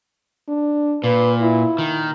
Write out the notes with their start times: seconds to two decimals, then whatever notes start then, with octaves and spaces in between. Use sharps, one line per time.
0.48 D4
1.04 A#2 B4
1.41 E4
1.78 D#3